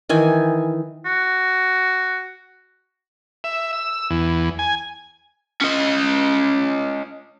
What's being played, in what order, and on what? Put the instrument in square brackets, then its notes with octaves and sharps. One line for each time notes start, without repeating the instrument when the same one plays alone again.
[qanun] D#3 E3 G#5
[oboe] F#4
[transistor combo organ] E5
E6
E2
G#5
[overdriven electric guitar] C#4 D#5